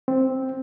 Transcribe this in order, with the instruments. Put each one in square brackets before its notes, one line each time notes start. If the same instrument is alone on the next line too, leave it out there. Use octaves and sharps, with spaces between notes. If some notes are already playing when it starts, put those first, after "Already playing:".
[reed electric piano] C4